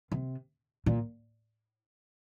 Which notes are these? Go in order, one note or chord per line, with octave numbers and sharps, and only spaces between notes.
C3
A#2